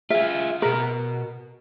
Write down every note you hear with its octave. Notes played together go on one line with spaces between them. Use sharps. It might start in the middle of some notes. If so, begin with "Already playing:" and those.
F4 G#4 E5
B2 A#4 B4